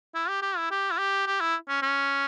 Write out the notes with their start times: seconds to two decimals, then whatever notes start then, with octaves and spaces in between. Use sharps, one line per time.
0.15 E4
0.29 G4
0.42 G4
0.57 E4
0.71 G4
0.91 E4
0.98 G4
1.27 G4
1.40 E4
1.68 C#4
1.82 C#4